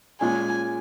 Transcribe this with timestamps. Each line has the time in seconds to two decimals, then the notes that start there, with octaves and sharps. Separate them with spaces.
0.21 A#2 G#3 C#4 G#4 G#5